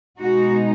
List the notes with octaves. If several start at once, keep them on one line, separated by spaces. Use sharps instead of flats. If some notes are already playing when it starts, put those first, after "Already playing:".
B2 G#3 D#4 F#4